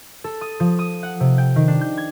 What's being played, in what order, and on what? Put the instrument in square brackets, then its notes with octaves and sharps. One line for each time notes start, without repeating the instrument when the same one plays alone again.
[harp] A4
D#6
F3
D#6
F#5
C3
G5
D#3
D4
G6
G#6